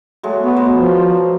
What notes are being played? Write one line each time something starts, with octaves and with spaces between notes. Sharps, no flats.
F#3 G#3 A3
B3
B2 C5
F3